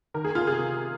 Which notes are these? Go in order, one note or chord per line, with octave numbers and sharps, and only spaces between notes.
D#3 A#4
G#4
F4
C3 G#4